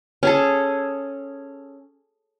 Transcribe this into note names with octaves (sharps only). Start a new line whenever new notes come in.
C#4 G#4 A4